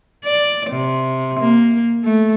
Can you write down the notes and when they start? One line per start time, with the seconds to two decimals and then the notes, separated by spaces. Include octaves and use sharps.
0.24 D5
0.71 C3
1.40 A#3
2.04 A3